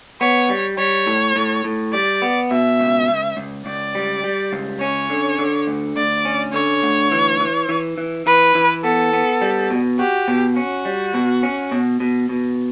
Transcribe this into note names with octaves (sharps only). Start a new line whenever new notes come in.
B3 C#5
G3
G3 C#5
A2
A2
A2
G3 D5
B3
B2 E5
C#2
C#2
C#2
C#2 D5
G3
G3
C#2
C#4 C#5
D3
D3
D2
D2 D5
C#4
D3 C#5
D2
E3
E3
E3
E3
E3 B4
E3
B3 A4
B3
G3
B2
F#4 G4
B2
C#4 F#4
G3
B2
C#4
B2
B2
B2